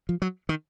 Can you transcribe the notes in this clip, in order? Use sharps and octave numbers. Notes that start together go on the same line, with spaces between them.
F3
F#3
D#3